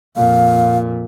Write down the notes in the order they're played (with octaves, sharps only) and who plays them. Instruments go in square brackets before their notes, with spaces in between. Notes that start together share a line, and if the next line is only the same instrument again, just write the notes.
[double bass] F2 A#2 [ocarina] F5